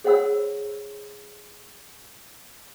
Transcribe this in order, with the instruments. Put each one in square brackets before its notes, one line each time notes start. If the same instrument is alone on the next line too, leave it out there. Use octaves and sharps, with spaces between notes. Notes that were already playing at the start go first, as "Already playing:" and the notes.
[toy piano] G#4 C5 C#5 F#5 B5 E6